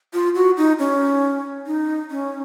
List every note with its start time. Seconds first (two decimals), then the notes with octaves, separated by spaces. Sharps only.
0.14 F4
0.35 F#4
0.57 D#4
0.79 C#4
1.67 D#4
2.11 C#4